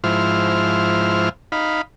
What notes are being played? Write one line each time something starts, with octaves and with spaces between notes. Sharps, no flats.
G#2 F3 E4 C5 F6
D#4 F5 B5